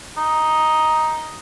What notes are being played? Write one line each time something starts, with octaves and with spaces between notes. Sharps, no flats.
D#4